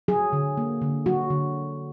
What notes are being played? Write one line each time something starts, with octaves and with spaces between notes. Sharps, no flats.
F#3 G#4
D3
A#3
D3
F#3 F#4
D3